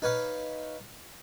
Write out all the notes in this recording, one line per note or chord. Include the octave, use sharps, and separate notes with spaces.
D#4 B4 C#5 F5